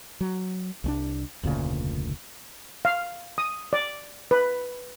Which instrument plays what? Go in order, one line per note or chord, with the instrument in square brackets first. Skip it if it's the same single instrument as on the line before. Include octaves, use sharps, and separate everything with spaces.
[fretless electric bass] F#3
C2 G#3 D4
F1 D2 A#2 C#3
[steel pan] F5
D#6
D5
B4